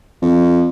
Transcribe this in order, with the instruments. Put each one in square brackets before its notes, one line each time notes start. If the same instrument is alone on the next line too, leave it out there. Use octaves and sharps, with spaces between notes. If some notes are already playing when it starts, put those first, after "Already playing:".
[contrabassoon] F2